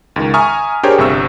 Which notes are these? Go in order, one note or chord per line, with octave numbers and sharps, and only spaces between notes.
C#2 D#3
E5 G#5 A#5 C#6 D#6 F6
D4 G4 G#4 A#4 C5 C#5
G1 G2 C3 E5 C#6 E6